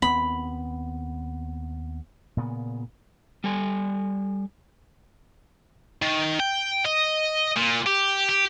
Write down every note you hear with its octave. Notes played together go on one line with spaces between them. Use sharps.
D#2 B3 C4 B5
A#2 C#3 B3
G3 A4 G#5
D#3
G5
D#5
A#2
G4
G4